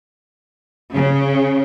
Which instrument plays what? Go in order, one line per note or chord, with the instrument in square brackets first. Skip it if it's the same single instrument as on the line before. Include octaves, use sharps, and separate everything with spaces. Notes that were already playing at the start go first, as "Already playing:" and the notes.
[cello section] C#3